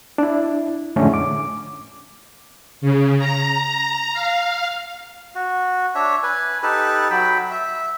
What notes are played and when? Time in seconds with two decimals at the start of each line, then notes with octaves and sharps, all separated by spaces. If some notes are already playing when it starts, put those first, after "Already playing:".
0.18 D4 E4
0.96 F2 A2 D3 G#3 A3 C#4
1.14 D6
2.81 C#3
3.19 A#5
4.13 F5
5.35 F#4
5.95 D4 C#5 E5
6.23 B4 G#5
6.63 D#4 G4 A4 B4
7.11 F#3 G5 B5
7.51 E5